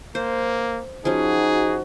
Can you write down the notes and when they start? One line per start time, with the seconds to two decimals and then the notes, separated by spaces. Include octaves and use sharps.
0.15 A#3 C5
1.05 F3 C#4 D#4 F#4 G#4